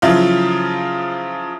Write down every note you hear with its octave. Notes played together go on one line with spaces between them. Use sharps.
C#3 F3 F#3 E4 F4